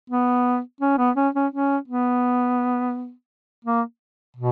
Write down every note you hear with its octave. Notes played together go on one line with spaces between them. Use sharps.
B3
C#4
B3
C#4
C#4
C#4
B3
A#3
B2